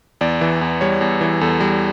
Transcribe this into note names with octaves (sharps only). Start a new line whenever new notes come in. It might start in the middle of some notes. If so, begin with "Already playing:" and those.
E2 D5
E3
E2
G3 C#5
E2
E3
E2 A4
G3